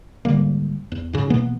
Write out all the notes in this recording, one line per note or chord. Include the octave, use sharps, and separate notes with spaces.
G#1 D3 G3 A#3
E2
G#2 C#3
B2 E3 A#3 B3